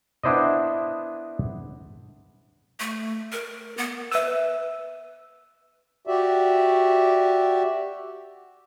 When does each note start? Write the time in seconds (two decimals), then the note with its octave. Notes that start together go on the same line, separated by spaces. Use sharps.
0.23 B3 D4 E4 C5 D5 D#5
2.80 A3
3.32 A#4
3.78 B3
4.12 B4 E5 E6
6.07 F#4 G4 D5 E5